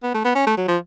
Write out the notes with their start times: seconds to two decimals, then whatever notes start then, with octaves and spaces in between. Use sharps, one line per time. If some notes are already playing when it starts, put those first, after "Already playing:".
0.03 B3
0.14 A3
0.25 B3
0.35 C#4
0.47 A3
0.57 F#3
0.68 F3